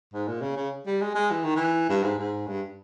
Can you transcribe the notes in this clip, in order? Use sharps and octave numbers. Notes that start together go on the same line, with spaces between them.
G#2
A#2
C#3
C#3
G3
G#3
G#3
E3
D#3
E3
G2
G#2
G#2
G2